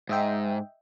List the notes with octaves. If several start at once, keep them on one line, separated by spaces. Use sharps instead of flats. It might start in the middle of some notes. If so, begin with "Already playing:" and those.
G#2 D#5 E5 G5